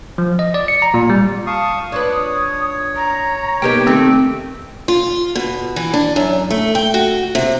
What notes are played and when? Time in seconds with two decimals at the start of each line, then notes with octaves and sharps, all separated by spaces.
0.18 F3
0.39 D#5
0.54 D5
0.68 C#7
0.82 A#5
0.94 A#2
1.10 G3
1.47 F5 A5 C#6 D#6
1.92 D4 F4 B4 C#5 D#6
2.96 A#5
3.62 A#3 B3 D#4 G4 G5
3.87 D#3 A3 C4
4.88 F4
5.35 B2
5.76 E3
5.94 D4
6.16 F#2
6.50 A3
6.75 G5
6.94 F#4
7.35 C3